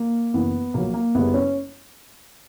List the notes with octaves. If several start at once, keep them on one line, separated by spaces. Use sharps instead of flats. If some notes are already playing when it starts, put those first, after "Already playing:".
Already playing: A#3
F#1 F#2 E3 B3
A#1 A#2 F#3 A#3
A#3
F#1 F#2 C#3 G3 B3
C#4